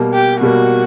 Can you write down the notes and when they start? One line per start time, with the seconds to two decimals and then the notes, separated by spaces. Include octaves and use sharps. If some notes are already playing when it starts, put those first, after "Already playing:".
Already playing: B2 G3 A#3
0.14 G4
0.41 B2 G3 A#3 F#4